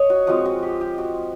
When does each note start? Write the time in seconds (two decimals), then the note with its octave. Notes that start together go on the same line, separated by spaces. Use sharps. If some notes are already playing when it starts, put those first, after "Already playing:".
Already playing: C#5 D#5
0.10 F#4
0.27 F3 G#3 C4 F#4
0.45 F#4
0.63 G4
0.81 G4
0.98 F#4